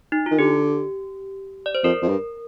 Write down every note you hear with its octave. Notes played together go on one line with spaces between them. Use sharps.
D#4
D#3 F4
D3 G4
D5
C5
F2 A#4
F2
G2